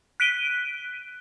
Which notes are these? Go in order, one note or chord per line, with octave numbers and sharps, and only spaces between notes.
F#6 B6 D7 D#7 G7